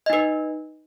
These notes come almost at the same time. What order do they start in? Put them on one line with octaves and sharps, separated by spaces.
D#5 D#4 B4